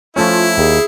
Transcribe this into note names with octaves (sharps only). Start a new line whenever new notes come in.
F3 A3 C#4 E4 F4
D#2 G#4